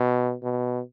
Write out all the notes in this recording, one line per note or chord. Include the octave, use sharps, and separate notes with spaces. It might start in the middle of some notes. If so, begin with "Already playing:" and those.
Already playing: B2
B2